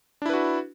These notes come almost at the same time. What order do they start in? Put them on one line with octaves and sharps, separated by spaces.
D4 E4 B4 F#4